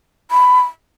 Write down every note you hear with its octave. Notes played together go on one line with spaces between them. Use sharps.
B5